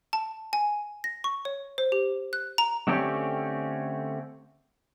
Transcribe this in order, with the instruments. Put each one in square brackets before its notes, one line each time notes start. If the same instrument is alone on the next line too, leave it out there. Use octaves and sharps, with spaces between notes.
[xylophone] A5
G#5
A#6
C#6
C#5
C5
G4
F#6
A#5
[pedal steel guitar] D3 A3 C4 C#4 G4